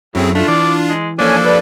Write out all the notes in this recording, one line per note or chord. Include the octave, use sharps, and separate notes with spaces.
F#2 A2 F#3 C4 G#4
A3 D4 F4 F5
E3 D5
G#3
F3 A#3 C#4 D4 A4 G#5
G3 B4 D5